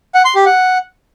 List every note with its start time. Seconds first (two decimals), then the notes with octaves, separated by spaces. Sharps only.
0.15 F#5
0.25 C6
0.35 G4
0.46 F#5